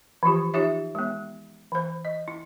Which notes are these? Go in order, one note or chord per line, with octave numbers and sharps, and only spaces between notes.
E3 F3 F4 G4
D#4 F4 G4 C#5 E5
G#3 B3
E3 C5
D#5
E4